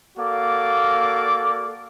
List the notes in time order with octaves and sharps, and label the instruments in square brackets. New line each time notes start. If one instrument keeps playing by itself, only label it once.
[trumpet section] A#3 F#4 A4 D5 F5 D6